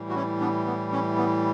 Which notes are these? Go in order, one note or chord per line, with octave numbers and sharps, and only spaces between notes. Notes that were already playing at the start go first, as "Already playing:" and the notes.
Already playing: A2 E3 G3
F#4
C#4 E4
B3 D4
B3
C#4
B3